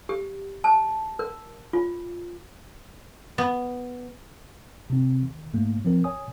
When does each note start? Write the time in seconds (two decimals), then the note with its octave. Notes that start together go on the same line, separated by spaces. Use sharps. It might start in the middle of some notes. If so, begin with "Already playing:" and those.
0.09 G4
0.64 A5
1.19 A#4
1.73 F4
3.38 B3
4.90 C3 C4
5.23 D#3
5.54 G#2 A3 A#3
5.85 F3 C4 A#4
6.04 C#5 G#5 D#6